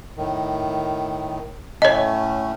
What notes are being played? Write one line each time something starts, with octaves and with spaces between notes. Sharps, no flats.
A2 D#3
A2 A3 C#4 C#5 D#5